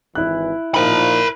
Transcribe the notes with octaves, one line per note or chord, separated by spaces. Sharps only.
G#1 E3 E4 F#6
A#2 F3 D#4 A#4 B5